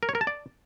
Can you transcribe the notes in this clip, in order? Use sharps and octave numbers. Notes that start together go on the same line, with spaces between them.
A#4
C#5
A#4
A5
D5